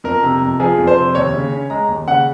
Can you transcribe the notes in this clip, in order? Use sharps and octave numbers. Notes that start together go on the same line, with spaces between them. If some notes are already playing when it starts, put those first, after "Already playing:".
F2 A#4
C3
F2
F3 G#4
F2
C5
C3
D#2 C#5
C#3
C#4
G#3 A#5
D#2
C#3 F#5